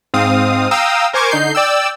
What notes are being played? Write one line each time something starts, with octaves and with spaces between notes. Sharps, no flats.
G#2 C4 F5 D#6
F5 G5 A#5 D#6 E6
A#4 C5 G#5 C#6 D6 G#6
D3 D#4 G6 C7
D5 G5 E6